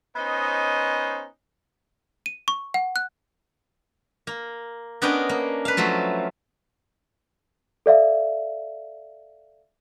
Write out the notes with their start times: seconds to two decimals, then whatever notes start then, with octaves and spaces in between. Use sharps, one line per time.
0.15 B3 C#4 D#4 C5 D#5
2.26 D#7
2.48 C#6
2.74 F#5
2.96 F#6
4.27 A#3
5.02 B3 C#4 D4 A#4 D#5 G5
5.29 A#3
5.65 B4 F5
5.77 F3 F#3 A3 F4
7.86 A4 D5 E5 F5